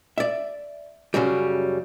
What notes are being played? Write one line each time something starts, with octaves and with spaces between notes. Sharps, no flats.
D5 E5
F#2 C#3 F#3 G3